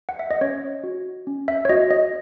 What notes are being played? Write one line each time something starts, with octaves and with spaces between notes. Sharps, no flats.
F#5
E5
D#5
C#4 C#5
F#4
C#4
E5
C#5
F#4 D#5
D#5